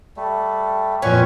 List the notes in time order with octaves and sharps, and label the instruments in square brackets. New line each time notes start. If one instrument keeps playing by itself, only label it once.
[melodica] G3 A3
[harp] F2 A#2 B4 [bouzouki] C#4 [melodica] G#5 C#6